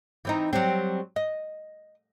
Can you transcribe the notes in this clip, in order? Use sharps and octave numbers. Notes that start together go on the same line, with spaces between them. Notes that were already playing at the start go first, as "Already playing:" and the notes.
E3 C4 D#4
F#3 G3 C4
D#5